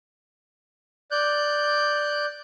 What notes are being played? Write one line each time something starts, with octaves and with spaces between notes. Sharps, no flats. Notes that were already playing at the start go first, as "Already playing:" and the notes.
D5 F#6 G6